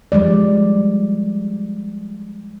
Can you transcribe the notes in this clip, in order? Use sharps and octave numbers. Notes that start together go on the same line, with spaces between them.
F3 G3 G#3 D5